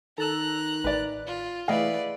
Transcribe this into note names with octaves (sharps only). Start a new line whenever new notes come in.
D#3 A4 A5 A#5 E6 F#6
A1 B4 D5
F4
E3 A3 E4 G#4 B4 D5 D#5 F5